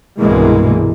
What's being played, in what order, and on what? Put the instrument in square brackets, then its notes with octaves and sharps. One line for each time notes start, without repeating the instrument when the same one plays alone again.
[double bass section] C2 G2 B2 E3 G#3 A#3